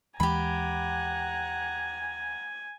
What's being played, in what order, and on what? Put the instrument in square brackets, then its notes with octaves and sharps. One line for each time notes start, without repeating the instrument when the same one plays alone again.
[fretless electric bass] D#2 E3 G#3 [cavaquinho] G4 B5 [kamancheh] F#5 A#5 [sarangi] G#5